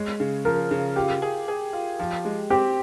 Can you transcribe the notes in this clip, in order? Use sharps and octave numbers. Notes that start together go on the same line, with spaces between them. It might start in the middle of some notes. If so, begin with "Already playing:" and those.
Already playing: G#3 C#5
C#3
F3 A#4
C#3
F4 G4
G#4
G#4
F4
F3
G#3
C4 G4